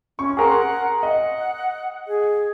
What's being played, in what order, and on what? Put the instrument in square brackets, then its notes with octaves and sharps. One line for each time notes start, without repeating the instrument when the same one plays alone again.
[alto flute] C#4 [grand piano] C#6
[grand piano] G#4 A#4 C6 [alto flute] F#5
[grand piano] D#5 [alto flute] F#5
[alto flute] G#4